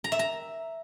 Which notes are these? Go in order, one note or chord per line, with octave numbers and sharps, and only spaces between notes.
A#5
E5
A#5